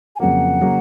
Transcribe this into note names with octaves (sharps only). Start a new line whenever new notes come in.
G#5
F2 C#3 F#3 A#3 F#5
C#3 F#3 A#3